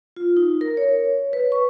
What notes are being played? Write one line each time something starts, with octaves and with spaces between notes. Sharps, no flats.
F4
D#4
A#4
C#5
B4
C#6